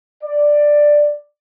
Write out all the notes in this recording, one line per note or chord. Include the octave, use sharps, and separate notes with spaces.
D5